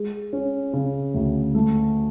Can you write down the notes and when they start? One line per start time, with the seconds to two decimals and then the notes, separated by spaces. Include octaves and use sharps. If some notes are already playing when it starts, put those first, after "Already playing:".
Already playing: G#3
0.33 C#4
0.73 C#3
1.14 D2
1.55 A3